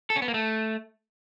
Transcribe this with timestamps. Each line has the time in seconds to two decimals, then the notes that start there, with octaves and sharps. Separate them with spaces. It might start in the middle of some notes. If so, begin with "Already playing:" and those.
0.10 A4
0.16 C#4
0.22 B3
0.28 A#3
0.34 A3